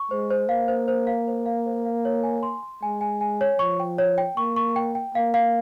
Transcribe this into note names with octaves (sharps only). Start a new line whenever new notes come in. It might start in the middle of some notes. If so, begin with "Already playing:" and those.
Already playing: C#6
G#3 C5
C5
A#3 F5
C5
C5
F5
C5
F5
C5
F5
C#5
G#5
C6
C6
G#3 G#5
G#5
G#5
C#5
F3 C#6
G5
C#5
G5
A#3 C#6
C#6
G5
G5
A#3 F5
F5